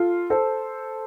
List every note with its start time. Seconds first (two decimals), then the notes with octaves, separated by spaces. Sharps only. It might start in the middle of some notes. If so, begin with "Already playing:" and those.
Already playing: F4 A4
0.30 A4 C5